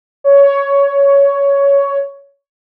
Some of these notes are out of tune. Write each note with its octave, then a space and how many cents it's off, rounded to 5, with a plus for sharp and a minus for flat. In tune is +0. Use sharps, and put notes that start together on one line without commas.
C#5 +10